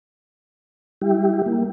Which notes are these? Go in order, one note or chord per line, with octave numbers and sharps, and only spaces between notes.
G3 E4 G4
A#3